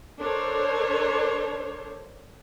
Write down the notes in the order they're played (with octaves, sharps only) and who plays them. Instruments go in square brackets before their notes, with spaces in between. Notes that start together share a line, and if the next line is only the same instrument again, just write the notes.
[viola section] D4 A4 A#4 C5 C#5